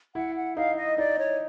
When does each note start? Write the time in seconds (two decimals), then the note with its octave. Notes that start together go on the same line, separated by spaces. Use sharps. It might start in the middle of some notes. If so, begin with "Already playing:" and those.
0.15 E4 F#5
0.36 F#5
0.56 D#4 F5
0.77 D#5
0.98 D#4 D5
1.19 C#5